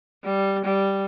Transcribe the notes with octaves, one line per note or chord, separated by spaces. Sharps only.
G3
G3